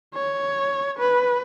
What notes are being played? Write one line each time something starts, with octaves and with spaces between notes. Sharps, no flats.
C#5
B4